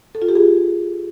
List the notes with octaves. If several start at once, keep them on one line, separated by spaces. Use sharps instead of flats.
A4
F4
G4
G#4